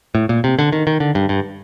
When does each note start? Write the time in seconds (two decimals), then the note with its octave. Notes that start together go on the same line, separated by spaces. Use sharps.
0.15 A2
0.29 A#2
0.44 C3
0.59 D3
0.72 D#3
0.87 D#3
1.00 D3
1.15 G2
1.29 G2